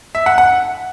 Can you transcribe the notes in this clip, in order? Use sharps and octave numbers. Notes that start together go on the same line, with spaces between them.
E5
F#5
F#5